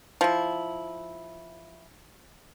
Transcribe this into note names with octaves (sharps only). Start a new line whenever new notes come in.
F3 E4